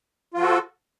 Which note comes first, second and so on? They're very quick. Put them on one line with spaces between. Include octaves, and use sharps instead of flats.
F4 F3 F#4 A4